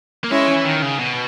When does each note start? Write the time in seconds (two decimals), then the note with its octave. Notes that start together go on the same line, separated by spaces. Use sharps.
0.24 A#3
0.30 G#3 C#4 E4
0.47 E3
0.65 D#3
0.82 C#3
0.99 B2